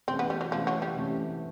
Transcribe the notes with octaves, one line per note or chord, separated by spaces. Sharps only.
C3 E3 A3 C4 C#4
B3
G3
F#3
C3 E3 F3 A3 C#4
F#3
G3
C3 E3 A3 C#4